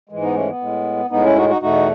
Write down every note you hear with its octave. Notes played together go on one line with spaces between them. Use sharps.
G#2 E3 G#3
B3 D#4
A3 C#4
B3
A2 G#3
A2 G#3 B3 D#4
C#4 E4
D#4 F#4
D#4 F#4
E2 B2 A3 D#4 F#4